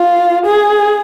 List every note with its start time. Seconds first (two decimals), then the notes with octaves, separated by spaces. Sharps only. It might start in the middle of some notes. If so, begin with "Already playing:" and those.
Already playing: F4
0.46 G#4